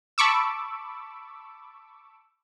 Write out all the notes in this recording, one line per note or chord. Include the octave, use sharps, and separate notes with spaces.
A5 B5 C#6 D6 E6